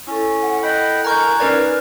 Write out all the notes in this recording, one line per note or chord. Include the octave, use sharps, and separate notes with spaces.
C#4 E4 A4
F#5
D#5 F#5 G5 B5
A#4 F#5 G#5 A#5 C#6 G6
C#4 D#4 A#4 B4 D5